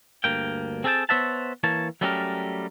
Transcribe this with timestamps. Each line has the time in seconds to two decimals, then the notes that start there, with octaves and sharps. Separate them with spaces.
0.24 D2 G2 A#3 G5
0.84 C4 G#4 A4 D5 G5 A5
1.09 B3 C5 C#5 E5 F#5 A5
1.63 E3 A#3 C#5 A5
2.01 F#3 G3 A3 C#4 G4 A#4